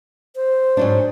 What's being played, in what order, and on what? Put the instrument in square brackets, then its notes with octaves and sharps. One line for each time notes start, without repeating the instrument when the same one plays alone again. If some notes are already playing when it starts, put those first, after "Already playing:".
[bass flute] C5
[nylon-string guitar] G#2 F#3 D4